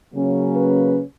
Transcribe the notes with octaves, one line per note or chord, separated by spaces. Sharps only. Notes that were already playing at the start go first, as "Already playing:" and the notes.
C#3 F#3 A#3 C#4
B4